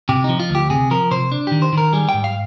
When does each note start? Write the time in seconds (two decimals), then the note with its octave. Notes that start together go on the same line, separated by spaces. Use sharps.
0.09 C3 G4
0.24 F3 D#4
0.40 F4
0.50 D2
0.55 G4
0.70 C3 G#4
0.91 F3 A#4
1.11 C3 C5
1.32 D4
1.47 D#3 G4
1.62 C5
1.73 D#3 A#4
1.93 G3 G#4
2.09 G#2 G5
2.24 F5